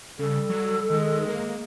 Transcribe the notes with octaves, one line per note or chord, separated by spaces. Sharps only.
C#3 G3 A4
F#3
D#3 G#3
A#3